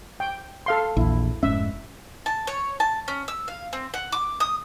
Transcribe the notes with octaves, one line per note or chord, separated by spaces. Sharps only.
G5
A4 F5 C6
A#1 E2 E4
F1 G#2 C#4 E5
A5
C#5
A5
C#4
E6
F5
C4
F#5
D6
D#6